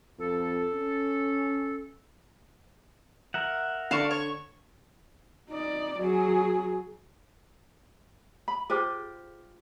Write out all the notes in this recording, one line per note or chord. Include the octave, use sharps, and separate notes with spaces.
F2 A4
C#4
A#4 E5 F#5
D3 D5 F5 C#6 E7
C#5 C#6
D#4 D5
F#3 G#4
B5
F4 G4 G#4 C5 D6